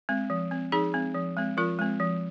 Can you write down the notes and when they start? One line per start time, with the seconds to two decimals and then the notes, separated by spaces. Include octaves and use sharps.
0.09 G#3 C4
0.30 F3
0.51 G#3 C4
0.72 F3 D#4 G#4
0.94 G#3 C4
1.14 F3
1.37 G#3 C4
1.57 F3 F4 A#4
1.79 G#3 C4
2.00 F3